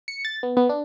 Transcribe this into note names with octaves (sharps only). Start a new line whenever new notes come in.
C#7
A6
B3
B3
D4